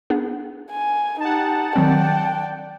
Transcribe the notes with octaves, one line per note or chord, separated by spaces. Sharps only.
B3 D4 G#4
G#5
D#4 G4 F#5 A5
D#3 F#3 C4 D5 G5